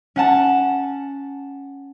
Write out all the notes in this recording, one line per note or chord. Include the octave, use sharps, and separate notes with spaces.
C#4 F#5 A5